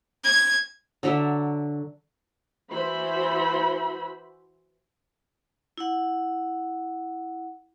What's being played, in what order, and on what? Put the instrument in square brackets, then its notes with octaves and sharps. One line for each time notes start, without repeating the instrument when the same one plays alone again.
[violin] G#6
[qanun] D3 F#3 D5 E5
[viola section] E3 E4 F#4 C5 B5
[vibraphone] E4 F#5